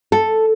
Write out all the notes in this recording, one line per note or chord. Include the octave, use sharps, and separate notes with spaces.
A4